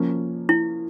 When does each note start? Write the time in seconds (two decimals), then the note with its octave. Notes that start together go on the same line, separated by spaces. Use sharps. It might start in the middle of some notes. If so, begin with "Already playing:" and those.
Already playing: F3 A#3 C#4
0.49 E4